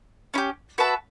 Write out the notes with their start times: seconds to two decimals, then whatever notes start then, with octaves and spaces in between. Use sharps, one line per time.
0.34 C#4 E4
0.38 G4
0.78 F#4 B4 E5 A5